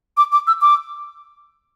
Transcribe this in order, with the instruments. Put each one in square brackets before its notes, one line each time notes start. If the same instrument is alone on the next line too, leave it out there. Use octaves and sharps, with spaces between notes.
[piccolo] D6
D6
E6
D6